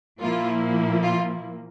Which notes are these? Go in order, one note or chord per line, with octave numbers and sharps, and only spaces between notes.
A#2 F3 A#3 E4 F4
F4